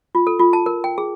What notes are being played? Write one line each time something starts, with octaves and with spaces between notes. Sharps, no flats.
F4
A4
F4
A5
A#4
G5
G#4